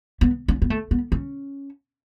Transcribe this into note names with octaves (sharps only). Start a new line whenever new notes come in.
B3
C#4
B3
A3
B3
C#4